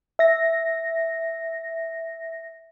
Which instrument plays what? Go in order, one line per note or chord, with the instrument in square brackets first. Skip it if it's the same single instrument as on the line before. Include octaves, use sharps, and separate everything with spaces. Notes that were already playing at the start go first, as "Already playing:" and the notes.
[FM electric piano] E5 A#6